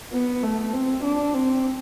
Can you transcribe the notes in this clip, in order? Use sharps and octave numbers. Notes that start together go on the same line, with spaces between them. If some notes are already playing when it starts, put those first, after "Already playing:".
B3
A3
C4
D4
C4